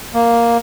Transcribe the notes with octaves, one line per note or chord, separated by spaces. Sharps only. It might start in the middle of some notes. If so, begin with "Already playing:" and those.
A#3